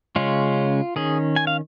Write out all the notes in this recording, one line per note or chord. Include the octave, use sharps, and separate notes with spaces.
C#3 G#3 C#4 F4
D#3 C#4 G#4
G#5
F5